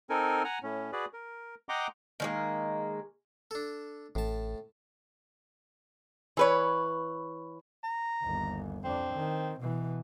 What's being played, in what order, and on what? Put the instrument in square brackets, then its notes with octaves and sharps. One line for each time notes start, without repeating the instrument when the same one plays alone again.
[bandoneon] C4 D#4 A4 A#4 G#5
F#5 G#5 A#5
A2 C#4
F#4 G#4 B4 D5
A#4
D#5 F#5 G5 A#5 C6 D6
[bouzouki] D#3 G#3 A#3
[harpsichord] D4 A4
[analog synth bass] A1 [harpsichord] A2 A5
[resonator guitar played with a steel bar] E3 B4 C#5
[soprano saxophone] A#5
[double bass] G1 D#2
[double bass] F2 D4 [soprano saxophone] C4
[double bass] D#3
B2 E3